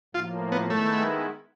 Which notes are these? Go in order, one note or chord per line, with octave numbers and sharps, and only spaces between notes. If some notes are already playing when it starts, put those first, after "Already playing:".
A2 F3 A#3 F4
B3
D#3 G#3 A3 B3 E4